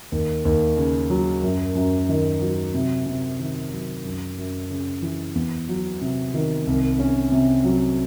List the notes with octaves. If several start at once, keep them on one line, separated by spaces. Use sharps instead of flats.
D#2
D#2
C#3
F#3
F#2
F#2
D#3
F#3
C3
C3
D#3
F#3
F#2
F#2
C#3
E3
E2
F#3
C3
D#3
C2
C#4
C3
F#3